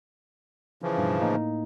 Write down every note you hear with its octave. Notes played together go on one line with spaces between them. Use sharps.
C#3 E3 F3
G2 B2
A2 A#3 D#4